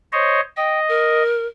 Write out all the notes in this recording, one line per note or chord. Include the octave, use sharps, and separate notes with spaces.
C5 C#5 D#5
D#5 G5
A#4